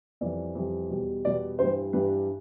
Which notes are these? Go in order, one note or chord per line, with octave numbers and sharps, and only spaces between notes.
F2 E3 G3 D5
F2 E3 G3
E2 B2 G3
E2 B2 G3 D5
G2 E3 G3 C5
G2 E3 G3 B4